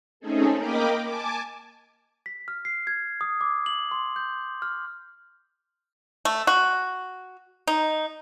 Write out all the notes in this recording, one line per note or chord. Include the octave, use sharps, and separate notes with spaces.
A3 C4 C#4 D#4 G#4 A4
A#3 A#4 D#5 G5 B5 D6
G#5 A5 D6
B6
F6
C7
G#6
D#6
D6
F#7
C6
G6
F6
A3
F#4
D#4